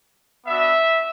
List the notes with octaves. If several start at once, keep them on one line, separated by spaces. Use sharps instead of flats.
B3 D4 F#4 E5